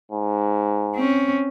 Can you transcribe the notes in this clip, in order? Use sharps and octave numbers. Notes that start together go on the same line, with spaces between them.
G#2
C4 C#4